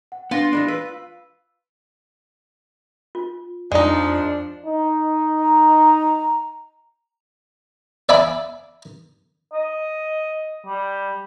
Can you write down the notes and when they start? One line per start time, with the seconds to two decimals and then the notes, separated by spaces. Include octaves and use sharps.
0.12 F#5
0.31 B3 D4 F4 A#6
0.53 E3 G#3 D4 B5 A#6
0.68 B4 E6
3.15 F4
3.72 F2 F3 G#3 D4 D#4 D5 F5
4.66 D#4
5.43 A#5
8.09 D5 E5 G#5 B5 D6
9.53 D#5
10.67 G3